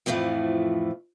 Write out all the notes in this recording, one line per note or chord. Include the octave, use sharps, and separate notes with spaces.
F2 A2 E3 F3 A3